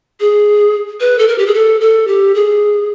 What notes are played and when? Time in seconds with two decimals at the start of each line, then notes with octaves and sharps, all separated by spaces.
0.20 G#4
1.00 B4
1.19 A4
1.28 A#4
1.38 G4
1.47 G#4
1.54 A4
1.81 A4
2.07 G4
2.35 G#4